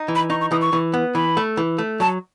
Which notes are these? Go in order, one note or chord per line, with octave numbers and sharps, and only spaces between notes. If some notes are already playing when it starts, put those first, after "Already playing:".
Already playing: D#4
E3
B5
D#4 C#6
C#6
E3 D#6
C#6
E3
B3
E3 B5
A3
E3
A3
F#3 A5